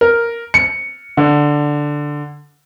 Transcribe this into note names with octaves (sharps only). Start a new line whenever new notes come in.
A#4
C#7
D3